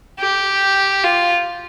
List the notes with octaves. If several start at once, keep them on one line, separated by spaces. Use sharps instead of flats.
G4
F4